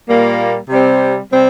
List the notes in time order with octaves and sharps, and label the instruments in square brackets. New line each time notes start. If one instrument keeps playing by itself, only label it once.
[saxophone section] A#2 G3 A#3
C3 G3 C4
C3 G3 C4